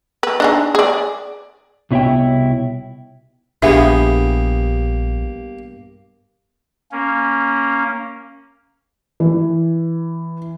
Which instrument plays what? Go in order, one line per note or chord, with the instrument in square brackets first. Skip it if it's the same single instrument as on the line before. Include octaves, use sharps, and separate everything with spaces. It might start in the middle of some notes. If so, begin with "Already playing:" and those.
[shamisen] B4
D4 D#4 G#4
G#4 D5
[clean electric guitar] C2 B2 E4 C#5 E5 G5
[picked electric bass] A#1 [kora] G2 B3 G#4 [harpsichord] A#3 G4 [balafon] E5
[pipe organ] A#3 C#4
[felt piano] E3